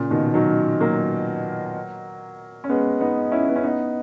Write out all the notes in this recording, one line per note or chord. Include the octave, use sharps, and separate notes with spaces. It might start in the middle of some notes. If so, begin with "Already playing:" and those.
Already playing: A#2 C#3
B2 D#3
D#3 F#3
F#3 A#3
C#4
G#3 B3
B3 D#4
C#4 E4
B3
C#4
B3 D#4